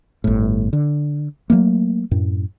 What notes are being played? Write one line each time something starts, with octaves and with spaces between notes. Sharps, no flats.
G1 A2
D3
F#3 G3 A3 A#3
F#2 A2